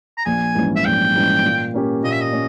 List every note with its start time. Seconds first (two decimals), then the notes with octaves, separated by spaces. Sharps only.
0.18 A#5
0.25 A#1 G#5
0.55 G#2 E3 G3 C#4
0.76 E5
0.85 A#1 G5
1.15 G#2 E3 G3 C#4
1.44 A#2
1.74 A#3 C#4 G4
2.04 A#2 D#5
2.12 E5
2.21 D#5
2.33 C#4